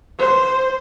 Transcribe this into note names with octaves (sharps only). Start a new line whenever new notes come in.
C5